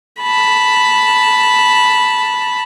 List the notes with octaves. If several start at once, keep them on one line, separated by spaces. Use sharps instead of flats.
A5 B5